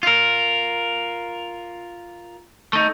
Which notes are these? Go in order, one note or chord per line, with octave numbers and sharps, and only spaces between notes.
F4 A#4
A3 D#4